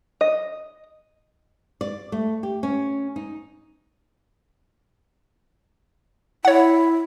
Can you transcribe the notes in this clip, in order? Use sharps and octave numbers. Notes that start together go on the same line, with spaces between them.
D#5
D5
A3
G4
C#4
D#4
E4 C#5 F#5